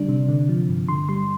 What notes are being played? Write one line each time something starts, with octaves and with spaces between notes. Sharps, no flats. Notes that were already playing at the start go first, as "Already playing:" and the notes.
Already playing: D3 G3 D4
C3
D3
F3
G2
D3 C6
G3 C6